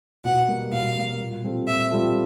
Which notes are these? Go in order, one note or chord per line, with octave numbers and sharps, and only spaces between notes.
B2 F#5
G3 A#3
B2 F5
G3 A#3
A#2
G3 C4 F4 A4
A#2 E5
G3 C4 F4 A4